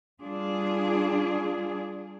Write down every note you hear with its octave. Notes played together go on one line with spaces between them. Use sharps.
G3 D4 F4 G#4